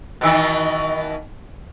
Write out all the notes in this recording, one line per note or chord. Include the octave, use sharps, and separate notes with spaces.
B2 D#3 E3